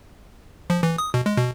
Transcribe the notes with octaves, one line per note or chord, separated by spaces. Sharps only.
F3
E3
D#6
B2
G#3
B2